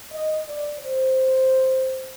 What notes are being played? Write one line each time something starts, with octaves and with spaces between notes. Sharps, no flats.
D#5
D5
C5